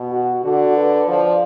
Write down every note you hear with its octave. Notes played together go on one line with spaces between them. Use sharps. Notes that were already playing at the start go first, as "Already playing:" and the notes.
Already playing: B2
F#4
D3 F#4
B4
F3 D5